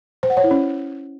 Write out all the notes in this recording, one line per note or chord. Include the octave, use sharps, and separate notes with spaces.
C5
F#5
C#5
E4
C#4